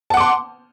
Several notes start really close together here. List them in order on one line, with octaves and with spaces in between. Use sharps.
A5 F#5 D6 C6